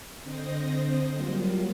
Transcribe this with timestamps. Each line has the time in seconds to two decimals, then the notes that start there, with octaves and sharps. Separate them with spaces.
0.22 D3 C4 C5 D#5 A#6
1.14 F#3 G3 A#3 F4